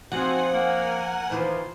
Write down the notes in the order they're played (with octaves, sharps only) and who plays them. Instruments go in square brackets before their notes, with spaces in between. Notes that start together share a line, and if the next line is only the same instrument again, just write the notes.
[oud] F3 [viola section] C4 D#4 G#5 [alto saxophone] F#4 [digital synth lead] F#5
[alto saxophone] A#3 [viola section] A#4 G#5
[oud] D#2 E3 F3 [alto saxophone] C5